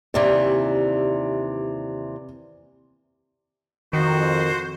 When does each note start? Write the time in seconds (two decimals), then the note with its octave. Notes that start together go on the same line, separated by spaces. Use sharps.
0.14 D#2 C3 E3 D5
3.93 F2 D#3 F#4 C5